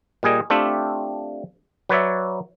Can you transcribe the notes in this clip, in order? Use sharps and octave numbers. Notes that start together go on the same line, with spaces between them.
A#2 G3 G#4 D#5
A3 C4 D4 F4 G4 E5
F#3 B4 C#5 D5 E5